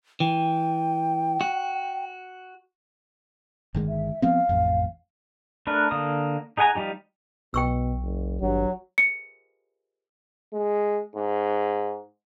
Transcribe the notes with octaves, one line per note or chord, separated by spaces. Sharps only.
E3 G5
F#4
G1 D#3 G#3
E5
F3 B3 C4 F5
A1 F2
A3 D4 A#4 B4
D3 A#3 D#6
D#4 G#4 F#5 G#5 A#5
F3 G3 D#4 G4
B1 B2 G5 C#6 E6
F#1
G#1 G2 F#3
C#7
G#3
G#2